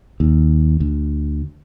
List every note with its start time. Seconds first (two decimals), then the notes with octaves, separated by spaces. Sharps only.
0.20 D#2
0.80 D2